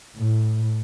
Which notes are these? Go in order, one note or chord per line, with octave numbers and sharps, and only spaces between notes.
A2